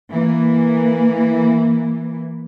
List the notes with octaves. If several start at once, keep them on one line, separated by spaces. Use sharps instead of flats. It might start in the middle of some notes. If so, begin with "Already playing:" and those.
E3 A#3